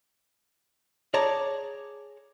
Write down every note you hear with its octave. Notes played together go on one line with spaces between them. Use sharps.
G#4 C#5 D5 A5 A#5